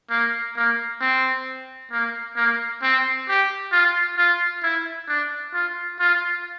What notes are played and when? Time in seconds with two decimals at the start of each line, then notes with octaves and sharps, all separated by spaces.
0.10 A#3
0.57 A#3
1.01 C4
1.92 A#3
2.37 A#3
2.82 C4
3.28 G4
3.72 F4
4.17 F4
4.63 E4
5.08 D4
5.54 F4
6.00 F4